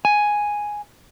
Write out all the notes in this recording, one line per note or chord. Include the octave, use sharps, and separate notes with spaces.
G#5